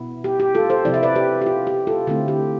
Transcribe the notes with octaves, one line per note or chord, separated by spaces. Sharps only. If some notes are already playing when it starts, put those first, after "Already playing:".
Already playing: B2 B3 E4
G4
G4
F4 A4
A4 C5
C3 F3 C4 E4 D5
E5
B4 D5
G4 B4
G4
F4
G4
F4 A4
D3 A3 C4 E4 F4
G4